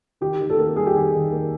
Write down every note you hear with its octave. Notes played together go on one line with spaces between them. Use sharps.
D#3 G4
D#3
A4
A#3
G3 G#4
G4
D#3 G#4
D#3
A#3